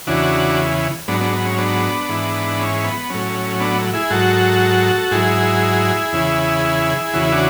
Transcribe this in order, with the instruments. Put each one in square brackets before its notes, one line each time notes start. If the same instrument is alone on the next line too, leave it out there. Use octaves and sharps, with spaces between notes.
[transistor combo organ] E2 C#3 E3 D4 F#4
G#2 F#3 B3 D4
B3 D4
B3
C#4
B3 D4
G#2 E3
C#4
B3
A2 F#3 C#4
B3 D4
E4 G#4
G#2 F#3 F#4 A4
G#2 F#3 E4 G#4
E2 C#3 E3
E2 C#3 E3 F#4
E4
D4 F#4